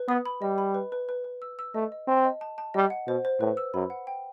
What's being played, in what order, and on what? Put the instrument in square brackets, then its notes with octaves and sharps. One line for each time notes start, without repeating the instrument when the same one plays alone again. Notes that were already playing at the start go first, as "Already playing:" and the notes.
Already playing: [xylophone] B4
[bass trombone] B3 [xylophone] D#6
[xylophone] B5
[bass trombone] G3 [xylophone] D#5
[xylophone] B5
B4
B4
B4
B4
E6
E6
[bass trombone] A3 [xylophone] D#5
[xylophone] D#5
[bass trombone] C4 [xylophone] A5
[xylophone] D#5
A5
A5
[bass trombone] G3 [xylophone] D#5
[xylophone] F#5
[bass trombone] B2 [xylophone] C5
[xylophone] C5
[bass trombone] A2 [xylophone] B4
[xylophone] E6
[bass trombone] F#2 [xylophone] B5
[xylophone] F#5
G5